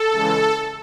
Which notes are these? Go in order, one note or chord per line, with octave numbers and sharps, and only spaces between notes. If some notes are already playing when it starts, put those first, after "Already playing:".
Already playing: A4
C#3 E3 G#3